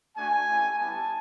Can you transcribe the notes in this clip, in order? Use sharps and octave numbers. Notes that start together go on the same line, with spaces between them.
A3 D4 F#4 G#5
A3 C#4 E4 G4
G3 B3 E4 G4 A5